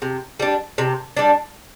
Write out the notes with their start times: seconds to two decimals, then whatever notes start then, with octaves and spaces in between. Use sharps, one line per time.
0.02 C3
0.40 G3 D4
0.78 C3
1.17 G3 D4